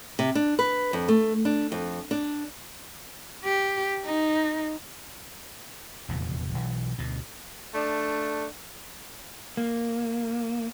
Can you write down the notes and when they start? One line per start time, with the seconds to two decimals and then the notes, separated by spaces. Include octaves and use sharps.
0.19 C3
0.35 D4
0.59 B4
0.93 F2
1.08 A3
1.45 D4
1.72 F2
2.11 D4
3.44 G4
4.04 D#4
6.09 F1 E2 A#2 C#3
6.54 B1 E3
6.98 D2 B2
7.74 A3 D4
9.57 A#3